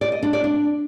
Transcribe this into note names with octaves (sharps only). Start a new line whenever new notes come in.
D5
D#5
D4
D5
D4